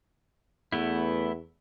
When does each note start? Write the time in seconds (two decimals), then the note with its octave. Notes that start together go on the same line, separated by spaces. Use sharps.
0.72 E2 A3 B3 E4